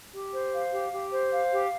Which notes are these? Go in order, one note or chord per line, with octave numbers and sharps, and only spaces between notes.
G4
C5
F5
G4
G4
C5
F5
G4